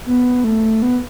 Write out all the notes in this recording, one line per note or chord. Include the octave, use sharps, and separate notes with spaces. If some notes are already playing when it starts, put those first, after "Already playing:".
B3
A3
B3